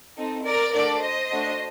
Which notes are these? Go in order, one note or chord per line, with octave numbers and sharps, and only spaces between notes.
C4 D#4 A4
A#4 D5
A3 D4 F#4 A4 A#4 D5
C5 D#5
A3 D4 F#4 A4